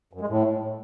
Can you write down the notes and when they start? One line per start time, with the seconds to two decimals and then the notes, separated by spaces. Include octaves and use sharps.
0.13 F#2
0.21 G#3
0.28 A2